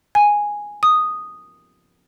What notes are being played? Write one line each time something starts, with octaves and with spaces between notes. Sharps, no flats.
G#5
D#6